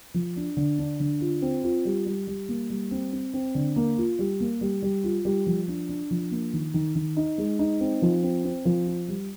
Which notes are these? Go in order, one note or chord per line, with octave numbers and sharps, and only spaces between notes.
F3
D4
D3
D4
D3
F4
C4
F4
G3
G3
G3
A#3
G3
C4
C4
C4
D3
A#3
F4
G3
A#3
G3
G3
F4
G3
F3
D4
D4
F3
A#3
D#3
D#3
D#3
D#4
G#3
D#4
C4
F3
C4
C4
F3
F4
G3